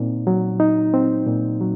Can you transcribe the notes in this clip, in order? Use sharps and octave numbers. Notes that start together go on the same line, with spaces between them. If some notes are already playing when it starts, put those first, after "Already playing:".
Already playing: A#2 C4 D#4
F#3
D#4
C4
A#2
F#3